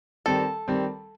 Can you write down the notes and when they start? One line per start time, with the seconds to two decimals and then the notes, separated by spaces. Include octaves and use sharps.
0.26 D#3 G3 C4 A4
0.68 D#3 G3 C4